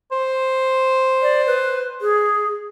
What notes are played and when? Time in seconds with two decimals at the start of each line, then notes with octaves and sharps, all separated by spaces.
0.12 C5
1.22 D5
1.47 B4
2.01 G#4